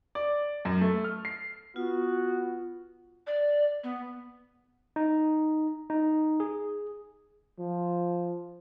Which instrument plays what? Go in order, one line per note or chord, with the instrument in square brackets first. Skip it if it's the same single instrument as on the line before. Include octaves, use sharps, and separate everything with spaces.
[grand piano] D5
F#2
A3
F6
C7
[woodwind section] B3 [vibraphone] F4 [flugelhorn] F#4
[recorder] D5
B3
[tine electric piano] D#4
D#4
G#4
[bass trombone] F3